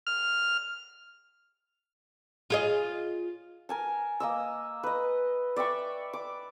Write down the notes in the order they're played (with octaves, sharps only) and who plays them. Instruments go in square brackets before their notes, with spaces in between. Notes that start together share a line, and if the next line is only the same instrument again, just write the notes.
[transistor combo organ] F6
[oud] F4 G#4 D#5
[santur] A#4 G#5 A5
A#3 D#5 E6
B4 D#5
D5 E5 G5 C#6
D6